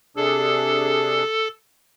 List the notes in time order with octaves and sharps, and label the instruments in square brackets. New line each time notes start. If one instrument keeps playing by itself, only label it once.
[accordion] C3 D4 G#4 [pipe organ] A4